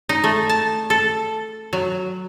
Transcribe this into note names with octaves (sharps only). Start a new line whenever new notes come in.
D#4
A3
A5
A4
F#3